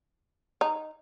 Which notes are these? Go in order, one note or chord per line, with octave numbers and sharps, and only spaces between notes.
D#4